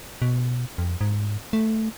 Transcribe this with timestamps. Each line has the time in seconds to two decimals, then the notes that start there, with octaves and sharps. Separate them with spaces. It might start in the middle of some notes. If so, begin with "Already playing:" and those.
0.22 B2
0.78 F2
1.01 G#2
1.53 A3